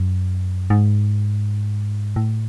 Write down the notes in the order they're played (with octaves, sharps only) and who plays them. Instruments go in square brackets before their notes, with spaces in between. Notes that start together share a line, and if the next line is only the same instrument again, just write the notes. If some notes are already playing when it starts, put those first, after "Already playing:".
Already playing: [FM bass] F#2
G#2
A2